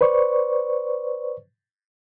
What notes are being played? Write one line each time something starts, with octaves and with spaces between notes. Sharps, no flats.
B4 C5 D5 C#6